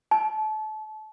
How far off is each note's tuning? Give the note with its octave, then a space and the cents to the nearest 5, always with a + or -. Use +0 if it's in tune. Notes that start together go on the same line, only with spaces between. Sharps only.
A5 -30